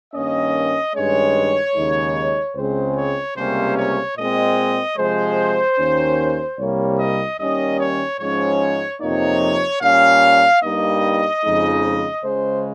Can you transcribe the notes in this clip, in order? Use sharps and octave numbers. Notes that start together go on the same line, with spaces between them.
G2 D#3 A#3 C#4 D#5
G2 D#3 G#3 C#4 C#5
D#2 C#3 G#3 D#4
C#2 C#3 G#3 C4 C5
C#5
C#2 C3 G3 A#3 C#4 C5
C#5
A#2 G#3 C4 D#5
C3 F3 G#3 C5
D#2 D#3 A#3 C#4
C2 C3 G3 A#3 C#5
D#5
D#2 D#3 G3 C#4 D#5
C#5
G#2 F3 G#3 C#4 C#5
F2 C3 F3 A#3 D#4 C#5
A#2 G3 C#4 F5
G2 G3 A#3 D#4 D#5
F2 C#3 F3 G#3 D#4
C#2 C#3 G#3 C5